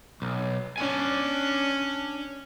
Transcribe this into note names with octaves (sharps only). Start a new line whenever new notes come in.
B1
C#4 D4 G#5